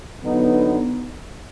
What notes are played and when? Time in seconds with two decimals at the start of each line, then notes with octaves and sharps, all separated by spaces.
0.23 D3 F#3 B3 D#4